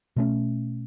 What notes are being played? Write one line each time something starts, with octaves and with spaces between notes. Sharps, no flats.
B2 A3 C#4